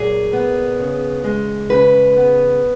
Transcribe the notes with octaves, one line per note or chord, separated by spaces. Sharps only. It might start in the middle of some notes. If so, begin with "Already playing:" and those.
Already playing: A#2 F#3 G#4
B3
C#3
G#3
C#3 B4
B3